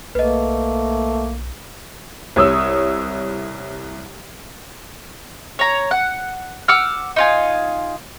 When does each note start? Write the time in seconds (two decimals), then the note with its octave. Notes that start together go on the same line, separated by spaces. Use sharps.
0.15 B1 A3 A#3 B4 D#5
2.36 C2 C#5 D#6 E6
5.59 C#5 A#5
5.91 F#5
6.68 F#5 D6 E6 F6
7.16 D#4 F4 G#5